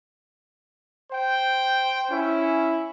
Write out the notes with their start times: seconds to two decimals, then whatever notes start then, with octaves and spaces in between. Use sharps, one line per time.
1.12 C5 G5
2.11 C#4 E4